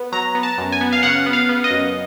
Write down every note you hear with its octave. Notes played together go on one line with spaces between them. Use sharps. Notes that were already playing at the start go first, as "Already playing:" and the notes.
Already playing: B3
F#3 A#5
B3
A5
F#2
G#5
B3
F5
C#3 F#5
B3
F5
B3
D#5
F#2